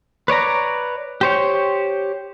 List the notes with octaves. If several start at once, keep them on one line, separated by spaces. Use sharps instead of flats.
B4 C#5 D5 A#5
G4 C5 C#5